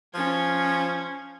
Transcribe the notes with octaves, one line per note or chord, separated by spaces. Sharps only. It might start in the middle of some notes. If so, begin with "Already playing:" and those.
F3 C#4 G#6